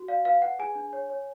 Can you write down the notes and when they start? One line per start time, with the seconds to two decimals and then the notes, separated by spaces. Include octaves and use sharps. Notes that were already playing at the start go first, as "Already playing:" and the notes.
Already playing: F#4
0.08 D5 F5
0.25 B4 F5
0.42 B4 F#5
0.59 G#4 G#5
0.75 D4
0.93 C#5
1.10 C#5